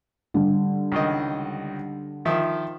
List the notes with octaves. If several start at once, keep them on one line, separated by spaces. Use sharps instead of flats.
D3 G3
C#2 D#3 D#5
D#3 F3 E5